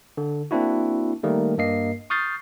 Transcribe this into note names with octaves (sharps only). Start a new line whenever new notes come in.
D3
A#3 C4 D4 E4 F#4
D#3 G3 A3 A#3
G2 A#3 D#5 C7
C#6 D#6 F6 G6 A6 C7